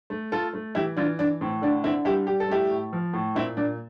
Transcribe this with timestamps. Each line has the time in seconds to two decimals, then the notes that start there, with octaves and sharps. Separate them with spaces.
0.10 A3
0.32 A3 F4 A4
0.53 A3
0.75 E3 E4 G4
0.97 E3 D4 F4
1.19 E3 D4
1.41 A2 C4
1.62 D3 D4
1.84 D3 C4 E4
2.05 G3 E4 G4
2.27 G3 G4
2.40 A4
2.48 A3 E4 G4
2.70 A2
2.93 F3
3.13 A2
3.35 A#2 C4 E4
3.57 A#2 D4